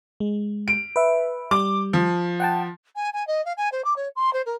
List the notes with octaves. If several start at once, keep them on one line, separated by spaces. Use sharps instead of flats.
G#3
D7
B4 E5
G3 D6
F3
F#5 G5 A5
G#5
G#5
D#5
F5
G#5
C5
D6
C#5
C6
C5
A#4